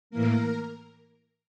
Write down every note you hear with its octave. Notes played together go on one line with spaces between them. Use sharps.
A2 E3 A#3 A#4